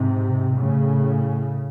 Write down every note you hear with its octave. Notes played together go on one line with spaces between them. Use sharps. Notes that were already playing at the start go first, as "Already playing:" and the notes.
Already playing: G#2 C3
A2 C#3